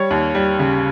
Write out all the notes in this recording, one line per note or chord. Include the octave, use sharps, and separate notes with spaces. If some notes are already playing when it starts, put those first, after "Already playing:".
Already playing: G3 C#5
D#2
G3
C#3